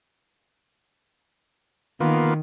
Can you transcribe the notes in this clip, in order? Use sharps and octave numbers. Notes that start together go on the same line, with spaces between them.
D#3 A#3 B3 F4